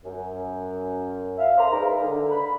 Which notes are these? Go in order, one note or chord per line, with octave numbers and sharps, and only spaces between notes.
F#2
E5 F5
C5 D5 A#5
G#3 D#4 A#4 B4 F5
D3
B5